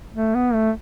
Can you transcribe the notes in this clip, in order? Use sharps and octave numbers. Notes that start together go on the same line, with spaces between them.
A3
B3
A3